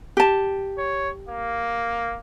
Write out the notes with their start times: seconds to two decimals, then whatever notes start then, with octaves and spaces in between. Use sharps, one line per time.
0.17 G4 A5
0.78 C#5
1.29 A#3